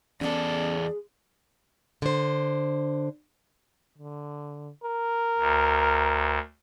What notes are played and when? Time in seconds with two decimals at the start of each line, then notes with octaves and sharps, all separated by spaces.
0.21 E2 G#3 B3 C#4 G#4 A4 D5
2.02 D3 C5
3.98 D3
4.84 A#4
5.38 D2